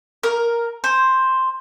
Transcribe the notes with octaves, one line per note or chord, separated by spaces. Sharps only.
A#4
C5